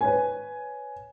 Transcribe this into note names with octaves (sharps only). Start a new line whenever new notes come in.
B4 C#5 G#5